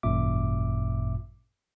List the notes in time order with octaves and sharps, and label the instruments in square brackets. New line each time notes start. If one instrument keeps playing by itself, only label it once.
[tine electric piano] G#1 F#2 A#2 E5 D6